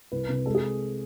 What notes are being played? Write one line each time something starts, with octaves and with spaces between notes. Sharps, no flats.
C2 B4
C3
G#3 A4
G#4